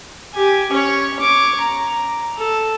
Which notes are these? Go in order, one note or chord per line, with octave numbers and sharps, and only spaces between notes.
G4 G#5
C#4 C#5
C#5 D6
A#5
A4